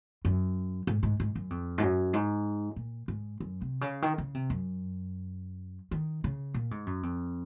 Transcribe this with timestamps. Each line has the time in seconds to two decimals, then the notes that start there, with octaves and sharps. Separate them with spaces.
0.25 F#2
0.87 G#2
1.03 G#2
1.20 G#2
1.36 F#2
1.50 F2
1.78 G#2
1.83 F#2
2.13 G#2
2.76 A#2
3.08 G#2
3.40 F#2
3.61 C3
3.81 C#3
4.02 D#3
4.18 C#3
4.34 C3
4.50 F#2
5.91 D#3
6.24 C#3
6.54 A#2
6.71 G#2
6.86 F#2
7.03 F2